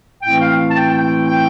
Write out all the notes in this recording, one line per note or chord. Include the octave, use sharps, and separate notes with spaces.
A2 E3 A3 C4 G5
F5
A5
G5
G5
G5